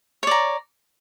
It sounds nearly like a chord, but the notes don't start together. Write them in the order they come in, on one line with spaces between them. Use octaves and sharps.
C#5 D5 A#5